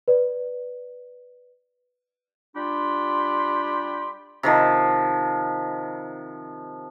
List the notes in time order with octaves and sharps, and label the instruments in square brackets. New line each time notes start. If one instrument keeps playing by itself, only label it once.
[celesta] B4 D5
[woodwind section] G3 D4 F4 G4 B5 C6
[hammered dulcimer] C3 D#3 F3